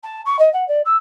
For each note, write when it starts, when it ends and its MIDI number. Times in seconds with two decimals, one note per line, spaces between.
0.03 0.21 81
0.25 0.38 85
0.38 0.51 75
0.53 0.67 78
0.68 0.81 74
0.85 0.96 88